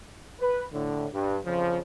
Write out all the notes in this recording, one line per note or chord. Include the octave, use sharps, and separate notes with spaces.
B4
A2 D3
G2
F2 C#3 F3